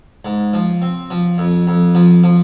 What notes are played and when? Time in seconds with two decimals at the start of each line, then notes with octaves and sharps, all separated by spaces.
0.25 G#2
0.54 F3
0.82 C4
1.11 F3
1.38 F2
1.67 F2
1.95 F3
2.24 F3